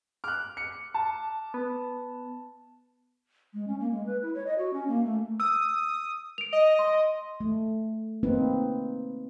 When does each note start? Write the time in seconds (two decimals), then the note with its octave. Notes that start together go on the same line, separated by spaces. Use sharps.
0.24 D6 F6 F#6
0.57 C#7
0.94 A5
1.54 B3
3.53 G#3
3.67 C#4
3.80 A#3
3.92 G#3
4.06 B4
4.22 E4
4.35 C#5
4.46 D#5
4.58 F#4
4.73 C#4
4.88 A#3
5.05 A3
5.40 D#6 E6
6.38 D7 F7
6.53 D#5
6.79 C6
7.40 A3
8.23 A#3 C4 D#4 B4